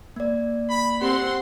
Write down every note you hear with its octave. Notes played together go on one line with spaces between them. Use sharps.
A#3 D5
B5
C4 G4 F#5 C6